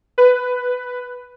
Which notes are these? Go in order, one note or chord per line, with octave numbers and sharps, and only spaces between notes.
B4